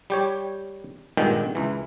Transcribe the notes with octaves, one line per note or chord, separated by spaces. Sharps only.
G3 G4 C#5
G#1 G2 A#2 D#3 G#3 G5
C#2 E3